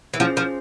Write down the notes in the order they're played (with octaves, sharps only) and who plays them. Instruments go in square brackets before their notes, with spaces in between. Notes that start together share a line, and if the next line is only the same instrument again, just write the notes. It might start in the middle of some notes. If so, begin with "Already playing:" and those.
[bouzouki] E3
[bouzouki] F3 [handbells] C#4 F4 G#4 C5 F5
[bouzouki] F3